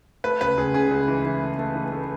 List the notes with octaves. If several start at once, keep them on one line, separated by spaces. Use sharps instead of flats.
A3 B4
C#2 B4
C#2 G#4
C#3 G#4
C#2
E3
E3
A3
A3
E3
A3